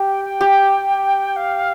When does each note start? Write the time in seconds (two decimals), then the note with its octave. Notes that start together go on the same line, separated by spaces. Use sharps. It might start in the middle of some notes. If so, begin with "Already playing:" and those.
Already playing: G4
0.08 G5
0.25 G5
0.41 G4
1.36 F5